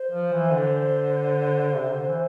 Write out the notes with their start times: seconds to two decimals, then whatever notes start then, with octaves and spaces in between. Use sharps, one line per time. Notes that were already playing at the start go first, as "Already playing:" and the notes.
Already playing: C5
0.11 F3
0.32 E3
0.52 D3
1.75 C3
1.91 D3
2.07 E3